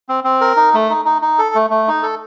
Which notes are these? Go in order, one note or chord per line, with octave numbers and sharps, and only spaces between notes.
C4
C4
A#4
D#4
A3
D#4
D#4
D#4
A4
A3
A3
D#4
A4